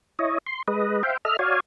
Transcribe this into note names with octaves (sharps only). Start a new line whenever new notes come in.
E4 C#5 D#5
C6
G#3 B4 D#5
C5 E5 F5 G5
A4 D#5 E5 F6
F#4 C#5 D5 F5 G#5